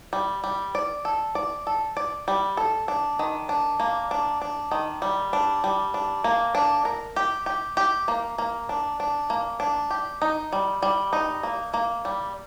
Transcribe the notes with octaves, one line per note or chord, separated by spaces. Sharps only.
G3
G3
D5
A4
D5
A4
D5
G3
A4
D4
D#3
D4
A#3
D4
D4
D#3
G3
D4
G3
D4
A#3
D4
A#4
G4
G4
G4
A#3
A#3
D4
D4
A#3
D4
G4
D#4
G3
G3
D#4
A#3
A#3
G3